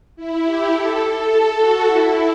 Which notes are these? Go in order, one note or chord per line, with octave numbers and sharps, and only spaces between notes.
E4
G4
A4
A4
A4
F#4
E4